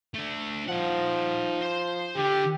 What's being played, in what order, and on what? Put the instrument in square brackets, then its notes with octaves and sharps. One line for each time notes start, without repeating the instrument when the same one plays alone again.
[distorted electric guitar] A3 D4
[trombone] F3 [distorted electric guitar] D#4 F#5
[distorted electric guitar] C5 C6
[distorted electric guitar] D3 [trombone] G4